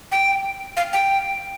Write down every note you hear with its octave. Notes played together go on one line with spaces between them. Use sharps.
G5
F5
G5